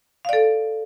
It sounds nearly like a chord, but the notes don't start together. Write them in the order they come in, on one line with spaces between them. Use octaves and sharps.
F5 D5 A4